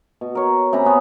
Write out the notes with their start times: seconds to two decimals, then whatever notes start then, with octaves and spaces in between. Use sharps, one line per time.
0.21 B2
0.35 A#4 C#5
0.73 C3 C#4 A#5 B5
0.86 B3 C#4